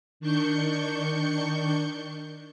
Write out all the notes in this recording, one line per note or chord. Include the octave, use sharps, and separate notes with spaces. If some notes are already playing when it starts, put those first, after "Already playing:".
D#3 D4 C#6 G6 C#7